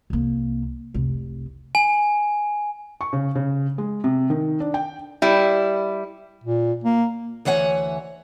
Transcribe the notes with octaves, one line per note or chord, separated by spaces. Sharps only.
C2 A#3
F1 C2
G#5
C#6
C#3
C#3
G#3
C3
D#3
D4
G5
G3 E4
A#2
A#3
D2 E3 C#5 F#5 G#5